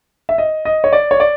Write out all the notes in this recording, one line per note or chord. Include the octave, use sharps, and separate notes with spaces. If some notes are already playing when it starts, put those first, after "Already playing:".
E5
D#5
D#5
C#5
D5
C#5
D5